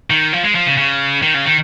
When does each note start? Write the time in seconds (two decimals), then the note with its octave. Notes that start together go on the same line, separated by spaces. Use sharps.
0.10 D#3
0.33 F3
0.43 G#3
0.55 F3
0.67 C#3
0.78 C#3
1.22 D#3
1.34 C#3
1.45 D#3